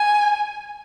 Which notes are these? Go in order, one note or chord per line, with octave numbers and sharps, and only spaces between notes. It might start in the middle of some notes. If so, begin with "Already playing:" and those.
Already playing: G#5